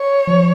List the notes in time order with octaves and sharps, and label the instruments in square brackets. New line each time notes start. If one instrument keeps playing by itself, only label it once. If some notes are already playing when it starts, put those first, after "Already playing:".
Already playing: [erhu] C#5
[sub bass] F3